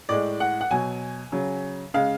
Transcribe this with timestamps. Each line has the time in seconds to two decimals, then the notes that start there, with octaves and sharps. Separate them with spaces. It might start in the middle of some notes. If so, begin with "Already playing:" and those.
0.09 A2 G#3 D5
0.40 F#5
0.61 F#5
0.71 B2 F#3 G#5
1.32 C#3 F#3
1.94 C#3 G#3 F5